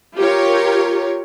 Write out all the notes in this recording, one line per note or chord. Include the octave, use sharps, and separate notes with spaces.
F4 G4 A#4 C#5